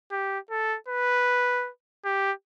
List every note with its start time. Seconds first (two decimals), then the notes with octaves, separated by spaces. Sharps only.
0.11 G4
0.50 A4
0.89 B4
2.05 G4